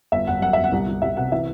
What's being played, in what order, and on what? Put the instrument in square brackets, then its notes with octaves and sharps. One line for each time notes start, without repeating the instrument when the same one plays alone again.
[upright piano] G1 E5
G1 F#5
F#2 F#5
G1 E5
F#5
C2
C2
C2 E5
C3 F#5
E3 E5